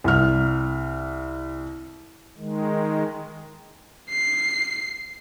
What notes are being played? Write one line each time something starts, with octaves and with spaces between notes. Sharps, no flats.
C2 F6
D#3 G#3
C7